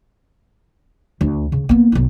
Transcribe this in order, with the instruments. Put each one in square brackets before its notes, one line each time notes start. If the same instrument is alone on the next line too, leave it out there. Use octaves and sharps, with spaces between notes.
[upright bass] D2
C#3
A#3 B3
B1 D#4